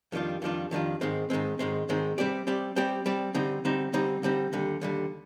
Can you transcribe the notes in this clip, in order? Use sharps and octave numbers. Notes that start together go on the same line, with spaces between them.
F2 D#3 G3 D4 F4
F2 D#3 G3 D4 F4
F2 D#3 G3 D4 F4
G#2 D#3 G#3 C4
G#2 D#3 G#3 C4
G#2 D#3 G#3 C4
G#2 D#3 G#3 C4
G3 C4 G4 D5
G3 C4 G4 D5
G3 C4 G4 D5
G3 C4 G4 D5
D3 G3 C4 D#4
D3 G3 C4 D#4
D3 G3 C4 D#4
D3 G3 C4 D#4
D#2 D3 G3
D#2 D3 G3